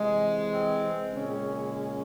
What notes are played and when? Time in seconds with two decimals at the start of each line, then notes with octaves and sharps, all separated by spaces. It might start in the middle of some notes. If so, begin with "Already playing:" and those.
Already playing: C3 E3 G#3
0.52 C4
1.14 A#2 C#3 G#3 C#4